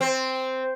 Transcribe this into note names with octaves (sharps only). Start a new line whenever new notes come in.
C4